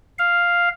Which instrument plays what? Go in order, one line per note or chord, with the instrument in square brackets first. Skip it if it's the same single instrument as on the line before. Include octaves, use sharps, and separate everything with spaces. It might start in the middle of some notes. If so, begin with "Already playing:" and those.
[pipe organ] F5